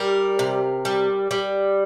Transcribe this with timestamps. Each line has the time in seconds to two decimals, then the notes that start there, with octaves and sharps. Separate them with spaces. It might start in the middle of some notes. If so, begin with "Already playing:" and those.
Already playing: G3 A#4
0.39 C3
0.85 G3
1.31 G3